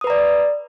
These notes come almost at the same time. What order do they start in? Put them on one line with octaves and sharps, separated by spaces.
D#6 B4 A#5 D5